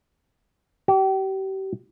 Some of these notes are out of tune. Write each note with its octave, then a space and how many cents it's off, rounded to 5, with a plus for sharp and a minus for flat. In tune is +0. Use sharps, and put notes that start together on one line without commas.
G4 -35